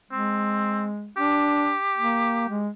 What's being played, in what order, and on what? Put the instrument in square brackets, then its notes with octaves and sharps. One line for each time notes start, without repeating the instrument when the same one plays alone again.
[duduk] G#3 [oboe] C4
[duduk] D4 [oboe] G4
[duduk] A#3
G#3